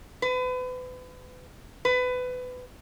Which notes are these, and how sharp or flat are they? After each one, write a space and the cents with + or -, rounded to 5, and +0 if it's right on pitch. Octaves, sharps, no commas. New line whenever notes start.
B4 +35
B4 +25